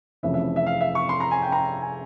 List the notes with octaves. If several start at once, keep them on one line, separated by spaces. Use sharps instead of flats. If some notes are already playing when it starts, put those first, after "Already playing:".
F1 F2 C#3 E3 E5
E5
E5
F5
E5
C#6
C6
A#5
G#5
G5
A#5
G#5